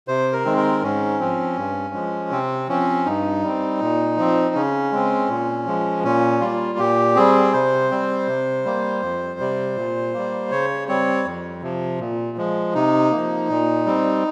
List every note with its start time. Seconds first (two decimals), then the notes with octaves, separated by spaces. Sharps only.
0.08 C3 C5
0.33 A#4
0.45 D#3 G#3 C4
0.57 A#4
0.82 G#2 C#4
1.20 F3 C4
1.57 G2
1.94 F3 G#3
2.31 C3 C4
2.69 F3 C4 C#4
3.06 G2 D#4
3.44 G3 C4
3.81 A#2
4.17 F3 C4
4.55 C#3 C#4
4.92 G#3 C4
5.29 A#2
5.66 F3 G#3
6.04 A#2 C#4
6.41 G3 A#3 F4
6.79 A#2 G4
7.16 G3 C4 G#4
7.53 C3 C5
7.91 G3 C4
8.28 C3
8.65 G3 A#3
9.02 F2
9.40 C3 G3
9.76 A#2
10.14 G3 A#3
10.51 C#3 C#5
10.88 G3 C4 C#5
11.25 F2
11.62 C3 F3
12.00 A#2
12.37 F3 G#3
12.75 C3 D#4
13.11 F3 A#3
13.49 A#2
13.86 G3 C4